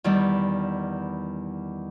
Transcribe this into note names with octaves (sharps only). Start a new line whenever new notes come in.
E2 D#3 G3 B3